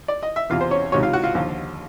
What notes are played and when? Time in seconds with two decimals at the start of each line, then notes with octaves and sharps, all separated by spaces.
0.08 D5
0.23 D#5
0.36 E5
0.50 E2 C3 E3 F4 F5
0.61 C5
0.71 C#4 C#5
0.92 C#2 C3 D#3 F#3 C#4 C#5
1.03 F4 F5
1.13 F#4 F#5
1.23 F4 F5
1.35 D#2 D3 F3